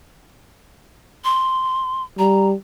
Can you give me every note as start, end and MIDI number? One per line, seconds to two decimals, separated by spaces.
1.25 2.03 84
2.19 2.54 55
2.19 2.47 82